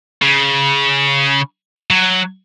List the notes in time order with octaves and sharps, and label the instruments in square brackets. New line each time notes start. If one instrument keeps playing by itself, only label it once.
[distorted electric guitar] C#3
F#3